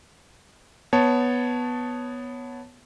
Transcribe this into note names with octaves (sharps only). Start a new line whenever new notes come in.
B3 C#5 A5